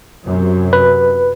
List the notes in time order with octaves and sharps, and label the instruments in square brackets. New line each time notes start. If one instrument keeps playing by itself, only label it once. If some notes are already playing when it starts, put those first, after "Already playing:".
[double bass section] F#2 C3
[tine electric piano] B4